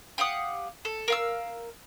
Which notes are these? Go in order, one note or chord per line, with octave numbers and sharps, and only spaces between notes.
G4 F5 F#5 D#6
A4
A#4 F5 E6